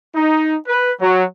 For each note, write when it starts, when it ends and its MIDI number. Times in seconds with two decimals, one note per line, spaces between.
0.14 0.55 63
0.67 0.91 71
1.00 1.23 54